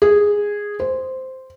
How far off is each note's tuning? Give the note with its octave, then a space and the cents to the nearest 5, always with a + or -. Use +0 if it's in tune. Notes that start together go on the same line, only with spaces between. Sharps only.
G#4 -10
C5 -5